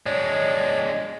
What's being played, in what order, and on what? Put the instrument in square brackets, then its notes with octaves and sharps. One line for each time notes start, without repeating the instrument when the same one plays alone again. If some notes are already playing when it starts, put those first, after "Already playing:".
[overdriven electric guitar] G#3 D4 [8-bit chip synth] C#5 D5